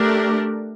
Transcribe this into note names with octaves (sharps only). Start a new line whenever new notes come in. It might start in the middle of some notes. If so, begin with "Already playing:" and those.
Already playing: A3 D4 G4 A#4